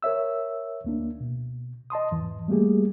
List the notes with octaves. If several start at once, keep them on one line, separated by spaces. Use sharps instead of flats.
A#4 C#5 E5 E6
D2 A#3 D4
B2
D#5 A5 C6 D#6
E2 G#2 E3
G3 A3 A#3 G4 G#4